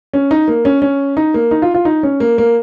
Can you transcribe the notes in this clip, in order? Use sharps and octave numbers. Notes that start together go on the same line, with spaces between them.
C#4
D#4
A#3
C#4
C#4
D#4
A#3
D#4
F4
F4
D#4
C#4
A#3
A#3